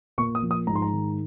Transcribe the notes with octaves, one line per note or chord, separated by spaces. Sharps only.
A#2 C#6
D#6
F3
D#6
G#2 A#5
C6
A#5
D#3